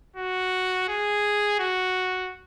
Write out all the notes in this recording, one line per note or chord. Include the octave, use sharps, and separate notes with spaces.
F#4
G#4
F#4